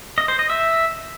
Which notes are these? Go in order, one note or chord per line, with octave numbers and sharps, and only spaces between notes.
D#5
C5
D#5
E5